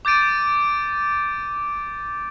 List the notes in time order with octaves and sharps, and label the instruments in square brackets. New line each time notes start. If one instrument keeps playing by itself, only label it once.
[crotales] D6 G6 A6 D7 D#7